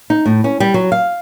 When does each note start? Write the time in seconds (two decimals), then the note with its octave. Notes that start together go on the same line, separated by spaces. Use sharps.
0.10 D#4
0.26 A2
0.44 C#4
0.60 G3
0.74 F#3
0.92 F5